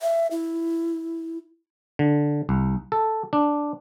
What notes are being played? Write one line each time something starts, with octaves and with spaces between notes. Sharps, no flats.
E5
E4
D3
C2
A4
D4